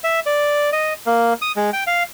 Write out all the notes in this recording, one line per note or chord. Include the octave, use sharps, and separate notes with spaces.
E5
D5
D#5
A#3
D#6
G#3
G5
F5